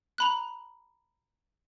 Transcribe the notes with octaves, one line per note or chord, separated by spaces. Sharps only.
A#5 B5 F#6